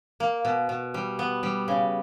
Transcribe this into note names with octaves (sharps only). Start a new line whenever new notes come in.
A#3
B2
B2
G3
B3
G3
C#3